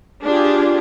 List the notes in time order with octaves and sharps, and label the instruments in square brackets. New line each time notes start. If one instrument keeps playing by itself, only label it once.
[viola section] D4 F4 G4 G#4